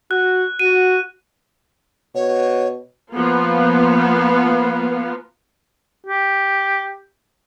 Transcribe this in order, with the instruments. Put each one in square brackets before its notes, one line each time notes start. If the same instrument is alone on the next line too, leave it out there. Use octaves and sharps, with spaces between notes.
[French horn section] F#4 [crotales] F#6
[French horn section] F#4 [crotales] D#7
[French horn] B2 [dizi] C#5
[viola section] F3 A#3 B3 F4 B4 F5
[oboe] G4